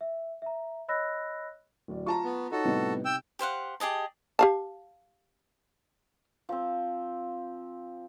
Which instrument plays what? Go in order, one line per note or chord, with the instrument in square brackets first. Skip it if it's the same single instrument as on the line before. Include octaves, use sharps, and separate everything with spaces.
[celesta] E5
E5 A#5
C#5 D#5 B5 E6 F#6 A#6
[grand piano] D1 D5
[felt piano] F4 A5 A#5 [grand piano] C#6
[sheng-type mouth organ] B3
[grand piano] D#4 C#5 [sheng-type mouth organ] F#4 A4
[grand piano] A2 G3 B3 [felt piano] C3 D#4
[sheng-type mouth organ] G5 E6
[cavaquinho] G4 C5 F5 F#5
G4 G#4 D#5 A5
[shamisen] G4 F5 A5
[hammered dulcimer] F3 C4